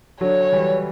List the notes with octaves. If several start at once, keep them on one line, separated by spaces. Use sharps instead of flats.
D3 F#3 C#5
E3 G3